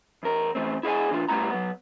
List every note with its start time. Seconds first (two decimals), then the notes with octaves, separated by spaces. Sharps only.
0.23 E2 A#4
0.55 E3 A3 C4
0.83 E4 G#4 D#5 G#5
1.11 D3 E3 D4 F4
1.29 C#2 G3 A3 B3 E4 A#5
1.50 F#3 B3